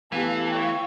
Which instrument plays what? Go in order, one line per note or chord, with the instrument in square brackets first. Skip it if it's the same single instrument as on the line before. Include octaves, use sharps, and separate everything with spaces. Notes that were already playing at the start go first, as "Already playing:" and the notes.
[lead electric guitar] E3 [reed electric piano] A3 B3 G4 [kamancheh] A4 [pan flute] F5
[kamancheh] C#5 G5